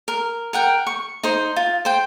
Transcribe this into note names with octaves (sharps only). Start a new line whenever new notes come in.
A#4
A#4 F#5 G5
C#6
D#4 C5
F4
C5 G5